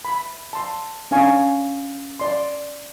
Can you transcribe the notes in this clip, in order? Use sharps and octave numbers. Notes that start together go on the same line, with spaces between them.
B5
A5 C6
C#4 D4 F5 G#5 A#5 C#6
D5 C6